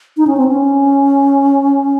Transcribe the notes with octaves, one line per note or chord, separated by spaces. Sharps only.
D#4
C#4
C4
C#4